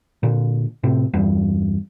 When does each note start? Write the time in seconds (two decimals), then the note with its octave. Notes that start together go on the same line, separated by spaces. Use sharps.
0.23 A#2 D3
0.83 A2 C3
1.13 E2 G2